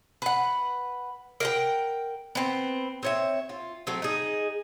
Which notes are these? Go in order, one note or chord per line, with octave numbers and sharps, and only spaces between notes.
B4 F#5
A#4 F#5 G5
B3 C4
C4 C#5 E5
F4
F#3 A3 C4
D#4 G#4